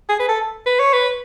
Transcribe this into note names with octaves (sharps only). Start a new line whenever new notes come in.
G#4
B4
A4
B4
C#5
B4